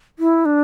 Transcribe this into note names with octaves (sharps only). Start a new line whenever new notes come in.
E4
D4